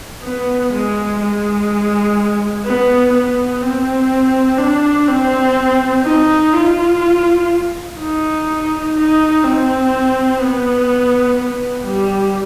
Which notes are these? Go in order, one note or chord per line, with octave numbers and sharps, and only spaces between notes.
B3
G#3
G#3
B3
B3
C4
D4
C4
D#4
F4
D#4
D#4
C4
B3
B3
G3